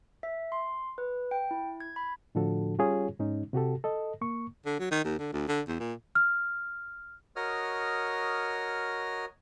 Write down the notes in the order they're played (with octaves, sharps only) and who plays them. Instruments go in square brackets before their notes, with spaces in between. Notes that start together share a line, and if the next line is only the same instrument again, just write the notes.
[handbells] E5
C6
B4
G5
E4
G#6
B5
[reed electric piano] A2 D3 F3 D4 F#4 A4
G3 C#4 F4 G4 G#4 C#5
G#2 G#3 C#4 D#4
C3 F#4 G4 A4
A4 D#5
A#3 C#6
[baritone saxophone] D3
F#3
D#3
D#2
D3
D2
D3
E2
A#2
[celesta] F6
[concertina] F#4 A#4 C#5 D#5 D#6 F6